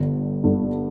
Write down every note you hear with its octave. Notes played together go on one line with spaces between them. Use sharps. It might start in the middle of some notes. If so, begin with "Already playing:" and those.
Already playing: G1 G2 D3
G1 G2 D3